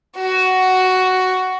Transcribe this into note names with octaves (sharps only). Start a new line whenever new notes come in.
F#4